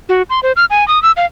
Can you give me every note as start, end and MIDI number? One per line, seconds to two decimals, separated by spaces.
0.09 0.22 66
0.30 0.40 84
0.43 0.52 72
0.56 0.65 89
0.70 0.87 80
0.88 1.01 87
1.03 1.12 88
1.17 1.25 77